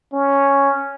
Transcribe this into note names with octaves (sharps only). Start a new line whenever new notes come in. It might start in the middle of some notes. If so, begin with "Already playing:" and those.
C#4